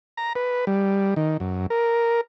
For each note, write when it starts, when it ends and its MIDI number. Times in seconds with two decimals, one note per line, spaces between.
0.17 0.33 82
0.35 0.65 71
0.67 1.14 55
1.16 1.37 51
1.40 1.66 42
1.70 2.21 70